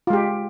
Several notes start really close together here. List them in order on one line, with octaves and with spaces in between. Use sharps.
F4 G#3 G4